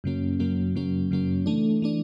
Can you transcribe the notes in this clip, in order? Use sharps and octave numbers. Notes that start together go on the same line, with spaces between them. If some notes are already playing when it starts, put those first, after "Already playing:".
F#2 C#3 F#3 A#3 C#4
F#2 C#3 F#3 A#3 C#4
F#2 C#3 F#3 A#3 C#4
F#2 C#3 F#3 A#3 C#4
E3 A3 D4
E3 A3 D4